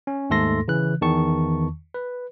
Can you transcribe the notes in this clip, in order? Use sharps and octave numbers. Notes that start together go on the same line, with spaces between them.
C#4
D#2 G#2 A3 A4 C6 A#6
C#3 E3 F#6
E2 D#3 A5 C#6
B4